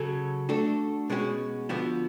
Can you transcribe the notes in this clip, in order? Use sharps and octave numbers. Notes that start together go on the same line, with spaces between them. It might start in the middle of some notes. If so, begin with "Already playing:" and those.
Already playing: C#3 F#3 C#4 F#4 A4
A3 D4 F#4 A4
B2 G#3 C#4 F#4
D3 F3 B3 F#4